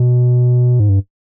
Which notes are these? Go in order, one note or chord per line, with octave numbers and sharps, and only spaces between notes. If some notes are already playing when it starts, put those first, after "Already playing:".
Already playing: B2
G#2
G2